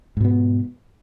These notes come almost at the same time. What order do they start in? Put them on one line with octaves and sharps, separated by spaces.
G#2 B2 B3